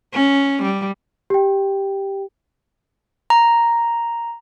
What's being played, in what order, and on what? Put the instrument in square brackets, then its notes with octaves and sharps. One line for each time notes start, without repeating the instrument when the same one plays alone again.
[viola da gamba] C#4
G3
[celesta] G4 G5
[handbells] A#5